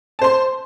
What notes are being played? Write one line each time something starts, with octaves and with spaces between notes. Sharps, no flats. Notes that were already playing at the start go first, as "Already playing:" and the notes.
C5 A5 C6